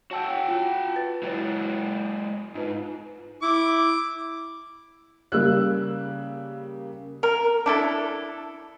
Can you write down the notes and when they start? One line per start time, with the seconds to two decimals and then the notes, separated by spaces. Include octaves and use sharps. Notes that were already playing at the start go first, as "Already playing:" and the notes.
0.11 F#4 C#5 F#5 G5 A5 E6
0.49 F4
0.96 B4 A6
1.23 F#3 G#3 E4 F#4 C#5
2.55 G#2 D#4 F4 B4
3.42 E4 D6
5.32 C#3 G3 A#3 E6 F#6
7.23 A#4
7.66 D4 E4 A4